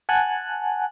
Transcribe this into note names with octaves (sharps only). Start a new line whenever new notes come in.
F#5 G#5 A5 F#6